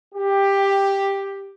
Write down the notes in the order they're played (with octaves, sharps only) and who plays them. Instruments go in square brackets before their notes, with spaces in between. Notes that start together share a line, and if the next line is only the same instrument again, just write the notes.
[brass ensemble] G4